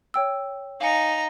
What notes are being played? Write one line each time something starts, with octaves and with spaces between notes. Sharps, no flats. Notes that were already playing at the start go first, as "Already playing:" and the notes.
C#5 G5 E6
D#4 F5 G#5 A#5 C#7